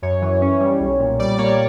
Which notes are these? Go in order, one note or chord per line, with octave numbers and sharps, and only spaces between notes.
F#2 C#5
E3
C#4
G3
B1
A#2
G3 D5
A#3 C#5